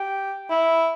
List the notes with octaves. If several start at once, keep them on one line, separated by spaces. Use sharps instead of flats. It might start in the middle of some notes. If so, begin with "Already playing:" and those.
Already playing: G4
E4